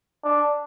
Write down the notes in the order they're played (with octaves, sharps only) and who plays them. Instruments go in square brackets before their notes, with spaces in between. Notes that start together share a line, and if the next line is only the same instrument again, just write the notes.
[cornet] D4